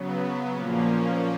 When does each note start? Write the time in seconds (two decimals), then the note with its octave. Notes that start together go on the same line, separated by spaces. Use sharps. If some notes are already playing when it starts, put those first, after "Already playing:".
Already playing: C#3 F#3 B3
0.52 A#2 F3 A#3 C#4